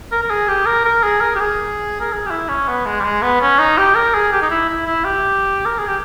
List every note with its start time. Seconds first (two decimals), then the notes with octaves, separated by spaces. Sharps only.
0.12 A#4
0.22 A#4
0.30 G#4
0.48 G4
0.66 A#4
0.85 A#4
1.03 G#4
1.21 A#4
1.36 G4
1.40 G#4
2.01 A#4
2.13 G#4
2.26 G4
2.31 E4
2.49 C#4
2.68 B3
2.86 G#3
3.01 G3
3.04 G#3
3.22 B3
3.41 C#4
3.59 D#4
3.78 G4
3.95 A#4
4.14 G#4
4.32 G4
4.42 D#4
4.51 E4
4.69 E4
4.87 E4
5.05 G4
5.66 A#4
5.79 G#4
5.87 G4